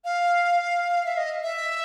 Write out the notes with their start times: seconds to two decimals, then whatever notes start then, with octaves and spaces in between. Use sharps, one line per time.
0.05 F5
1.06 E5
1.17 D#5
1.43 E5